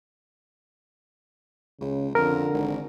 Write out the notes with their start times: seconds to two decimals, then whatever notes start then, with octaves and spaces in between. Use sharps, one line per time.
1.81 C#2 C#3
2.15 F2 D3 A#4
2.54 G#1